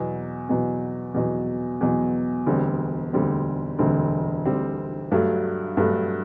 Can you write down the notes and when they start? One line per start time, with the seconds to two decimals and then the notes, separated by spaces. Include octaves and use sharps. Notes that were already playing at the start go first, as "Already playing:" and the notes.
Already playing: E2 B2 F#3
0.49 E2 B2 F#3
1.14 E2 B2 F#3
1.81 E2 B2 F#3
2.47 E1 D2 D3 G3 C4
3.13 E1 D2 D3 G3 C4
3.78 E1 D2 D3 G3 C4
4.45 E1 D2 D3 G3 C4
5.11 G2 F#3 A3
5.77 G2 F#3 A3